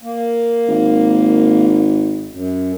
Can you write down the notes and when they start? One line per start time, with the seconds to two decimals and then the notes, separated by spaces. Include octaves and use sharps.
0.02 A#3
0.68 G#1
2.30 F#2